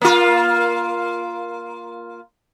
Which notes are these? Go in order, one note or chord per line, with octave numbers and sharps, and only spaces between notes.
A#3 F4